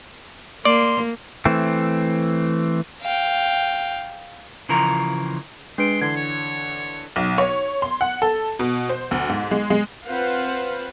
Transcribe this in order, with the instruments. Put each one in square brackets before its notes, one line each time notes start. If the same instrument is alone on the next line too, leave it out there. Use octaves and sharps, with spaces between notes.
[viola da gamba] A#3 [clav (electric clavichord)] D5 [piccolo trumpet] C6
[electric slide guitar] E3 A3 C4
[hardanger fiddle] F5 G5
[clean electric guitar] C#3 E3 F3 A#4
[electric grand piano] G#3 [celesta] D4 B4 D7 [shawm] C6
[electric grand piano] D3 E3 [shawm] C6 [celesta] G#6
[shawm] C#5
[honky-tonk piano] B1
C#5
C6
F#5
A4
B2
C5
D2
G#2
G#3
G#3
[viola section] C4 F4 B4 C5 F5 F#5